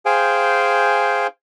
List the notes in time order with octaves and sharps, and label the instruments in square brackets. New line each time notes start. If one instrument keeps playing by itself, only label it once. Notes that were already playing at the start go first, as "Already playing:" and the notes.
[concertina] G#4 C5 F5 G5 G#5